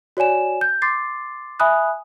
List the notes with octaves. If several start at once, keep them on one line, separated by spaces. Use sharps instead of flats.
F#4 C#5 D5 G#5 E7
G6
C6 D6 A6 C7
E5 G#5 B5 D#6 F#6